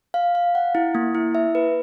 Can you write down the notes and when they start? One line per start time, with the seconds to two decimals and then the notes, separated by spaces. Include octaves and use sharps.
0.14 F5
0.35 F5
0.55 F#5
0.75 E4
0.95 A#3
1.15 E4
1.35 E5
1.55 B4